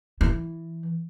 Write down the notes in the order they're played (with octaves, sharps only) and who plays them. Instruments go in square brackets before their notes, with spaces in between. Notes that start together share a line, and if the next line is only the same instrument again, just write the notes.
[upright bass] E3